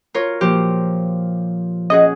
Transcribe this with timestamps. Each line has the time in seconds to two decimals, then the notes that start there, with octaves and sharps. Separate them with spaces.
0.14 F4 A#4 C#5
0.41 A#2 F3 G4
1.90 C#4 G#4 D#5 F#5